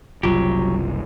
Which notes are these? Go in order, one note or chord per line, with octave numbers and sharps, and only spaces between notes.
F#1 C2 F#3 F4 G4